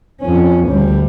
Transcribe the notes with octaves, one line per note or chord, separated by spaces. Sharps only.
F2 C#4
D2 G3